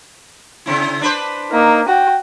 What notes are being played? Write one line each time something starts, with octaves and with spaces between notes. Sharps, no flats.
C#3 C4 E4
D4 B4 C5
A#3 D#4
F#4 G5